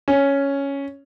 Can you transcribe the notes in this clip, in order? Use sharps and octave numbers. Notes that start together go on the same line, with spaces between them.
C#4